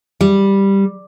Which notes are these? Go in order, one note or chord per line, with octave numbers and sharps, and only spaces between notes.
G3